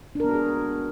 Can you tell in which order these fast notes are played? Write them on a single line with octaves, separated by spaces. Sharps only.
D4 A#4 B3 F#4 G#4